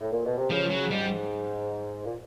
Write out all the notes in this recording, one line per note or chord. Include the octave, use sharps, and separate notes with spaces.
A2
A#2
B2
C3
C#3 F3
F#3
G#2 G3
A#2